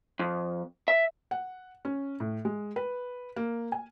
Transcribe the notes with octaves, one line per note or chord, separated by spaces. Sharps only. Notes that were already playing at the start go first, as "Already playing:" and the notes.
F2
E5
F#5
C#4
A2
G#3
B4
A#3
G#5